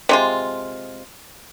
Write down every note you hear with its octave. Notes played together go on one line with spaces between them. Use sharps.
C3 G#3 F4